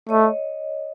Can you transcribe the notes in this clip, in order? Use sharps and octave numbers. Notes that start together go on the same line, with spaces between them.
A3 C#5 D#5